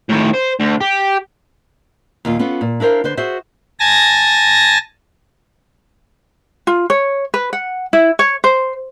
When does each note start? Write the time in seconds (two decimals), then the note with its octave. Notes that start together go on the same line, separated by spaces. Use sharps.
0.09 A2 D#3
0.34 C5
0.60 D2
0.81 G4
2.25 D#2 A#2 F4
2.39 B3 C#4 F4 A4
2.61 A#2
2.80 D4 E4 A#4 C5 F5
3.04 D3 B4 C5
3.17 F#4 G#4 C5 E5
3.80 G#5 A5 A#6
6.67 F4
6.90 C#5
7.34 B4
7.53 F#5
7.93 E4
8.19 C#5
8.44 C5